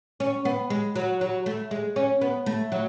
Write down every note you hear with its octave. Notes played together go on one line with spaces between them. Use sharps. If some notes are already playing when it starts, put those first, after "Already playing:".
C#4
B3
G#3
F#3
F#3
A3
G#3
C#4
B3
A3
F#3